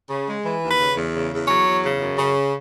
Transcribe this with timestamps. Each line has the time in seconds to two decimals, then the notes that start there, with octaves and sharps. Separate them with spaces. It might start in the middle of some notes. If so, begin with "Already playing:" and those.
0.10 C#3
0.27 G#3
0.43 E3
0.61 D#2
0.71 B4
0.78 C#3
0.96 E2
1.14 C#3
1.32 E2
1.48 F#3 C#5
1.66 E2
1.83 C#3
2.00 F#2
2.19 C#3